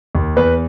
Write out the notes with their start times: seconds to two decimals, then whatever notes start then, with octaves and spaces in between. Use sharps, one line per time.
0.15 D#2
0.36 E2 B4